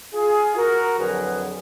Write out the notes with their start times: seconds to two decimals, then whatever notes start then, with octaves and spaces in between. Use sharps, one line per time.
0.14 F4 G#4
0.56 F#4 A#4
0.98 F2 D3 F#3 G#4 B4